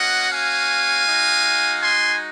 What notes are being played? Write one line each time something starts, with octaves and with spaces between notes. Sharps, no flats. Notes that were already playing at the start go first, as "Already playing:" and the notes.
Already playing: A#3 C#4 F#4 D#5 F#5
F5 G#5
G#3 D#4 F#4
G#5 C6